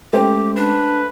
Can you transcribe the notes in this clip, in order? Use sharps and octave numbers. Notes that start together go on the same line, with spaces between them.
G#3 A3 C#4 G4 C5 G5
D4 B4